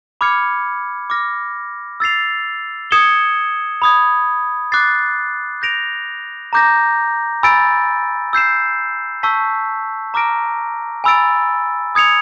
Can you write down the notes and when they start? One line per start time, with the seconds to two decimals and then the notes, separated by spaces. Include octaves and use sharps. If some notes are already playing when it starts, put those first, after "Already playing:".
0.21 B5 D6 F6 G#6 C#7
1.10 D6 F6 A#6
2.00 E6 A6 C7 F7
2.91 D#6 G#6 C#7 E7 G7
3.82 B5 D#6 G#6
4.72 D6 F#6 A6 C7
5.62 G6 A#6 D7 F7
6.53 A#5 D6 G6 A#6
7.43 G#5 B5 E6 A6 D7
8.33 E6 G6 C7 E7
9.23 A5 C#6 E6 G6 B6
10.14 A#5 D6 F6 A#6 D7
11.04 G#5 B5 E6 A6 D7
11.95 D#6 G#6 C#7 F7